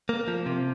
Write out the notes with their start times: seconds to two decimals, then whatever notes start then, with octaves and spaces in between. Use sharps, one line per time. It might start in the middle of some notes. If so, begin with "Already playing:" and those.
0.09 A#3
0.28 F3
0.46 C3